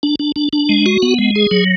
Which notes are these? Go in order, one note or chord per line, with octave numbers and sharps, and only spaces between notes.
D4
D4
D4
D4
G#3
F#4
B3
G#3
G#4
F#3